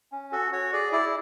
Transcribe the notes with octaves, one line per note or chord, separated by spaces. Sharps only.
C#4
F#4 A4
F#4 C#5
G#4 D5
E4 D5